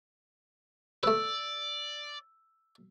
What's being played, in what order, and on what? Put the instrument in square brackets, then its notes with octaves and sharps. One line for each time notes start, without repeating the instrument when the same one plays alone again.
[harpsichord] A3 B4 [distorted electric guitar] D5 [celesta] E6